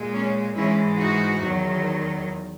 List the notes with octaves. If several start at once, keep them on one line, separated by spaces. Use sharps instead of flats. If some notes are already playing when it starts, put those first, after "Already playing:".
Already playing: A#2 G#3
A#3 C#4
G#2 E3 G#3 C#4 E4
D#4 F#4
E2 D#3 F#3